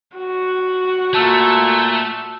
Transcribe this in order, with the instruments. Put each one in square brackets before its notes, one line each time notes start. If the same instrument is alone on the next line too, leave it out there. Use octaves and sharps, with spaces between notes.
[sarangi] F#4
[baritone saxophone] A#2 [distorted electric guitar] A3 [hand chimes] A5 E6 F#6